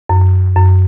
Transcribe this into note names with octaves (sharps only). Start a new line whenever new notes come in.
F#2
F#2